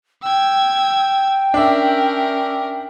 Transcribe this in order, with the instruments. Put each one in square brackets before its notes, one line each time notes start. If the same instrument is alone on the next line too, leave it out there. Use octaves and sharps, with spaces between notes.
[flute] G5 [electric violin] E6 G#6
[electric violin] C#4 A#4 [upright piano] D4 E5